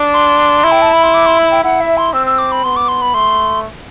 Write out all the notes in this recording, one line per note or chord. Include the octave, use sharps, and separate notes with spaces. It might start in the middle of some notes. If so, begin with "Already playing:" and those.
Already playing: D4
C6
E4
G5
A5
B5
C6
D6
C6
B5
G5
E4 F#5
E5
C6
C4 E6
E6
D6
B5
B3 C6
D6
C6
B5
A3 C6